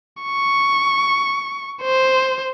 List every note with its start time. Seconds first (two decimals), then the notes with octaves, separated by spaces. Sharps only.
0.23 C#6
1.82 C5